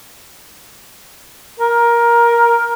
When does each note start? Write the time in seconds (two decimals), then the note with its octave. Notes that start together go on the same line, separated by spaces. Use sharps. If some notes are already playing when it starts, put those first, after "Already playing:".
1.59 A#4